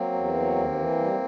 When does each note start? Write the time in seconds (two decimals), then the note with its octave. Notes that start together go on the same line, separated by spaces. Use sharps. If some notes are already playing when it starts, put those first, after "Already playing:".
Already playing: F#3 A#3 C4
0.13 E2
0.34 F#3
0.55 D#2
0.77 E3
0.98 G3